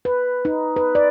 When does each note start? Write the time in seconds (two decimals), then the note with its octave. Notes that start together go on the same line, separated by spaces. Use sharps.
0.05 B4
0.45 D#4
0.76 B4
0.95 D5